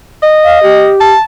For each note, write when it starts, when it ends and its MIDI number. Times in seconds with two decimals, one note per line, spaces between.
0.23 0.93 75
0.44 0.62 77
0.63 1.13 67
1.01 1.22 81